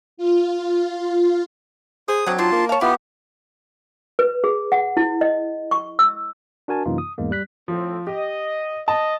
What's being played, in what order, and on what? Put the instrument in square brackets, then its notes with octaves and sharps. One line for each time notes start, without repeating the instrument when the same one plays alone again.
[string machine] F4
[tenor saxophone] G#4 [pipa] C5 [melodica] D#6
[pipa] D3 C4 [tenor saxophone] F#3
[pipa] C4 D4 D#4 [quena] F4 [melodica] A5 C6
[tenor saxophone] A#3
[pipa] C#5 F5 [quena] A5
[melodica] B3 G4 [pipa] E4 [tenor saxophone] F4 [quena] F#5
[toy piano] B4
G#4
F#5
E4
D#5
C#6
E6
[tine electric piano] D4 F#4 A#4 G#5 A5
F#2 C3 E3 A#3 D#4 F4
D#6
E2 G#2 G#3 A#3
G3 F#6 B6
[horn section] A2 C4 [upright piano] F3
[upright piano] G4 [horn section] D#5
[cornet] D#5 [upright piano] A5